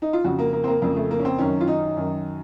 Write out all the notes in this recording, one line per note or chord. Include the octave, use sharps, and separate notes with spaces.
D#4
F4
F2 C#3 F#4
A#3
A#3
C4
A#3
F2 C#3 A#3
A3
A#3
C#4
C4
F#2 D#3 C#4
F4
D#4
F#2 D#3